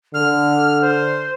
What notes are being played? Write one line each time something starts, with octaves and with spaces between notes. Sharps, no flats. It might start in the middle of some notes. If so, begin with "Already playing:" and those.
D3 F6
C5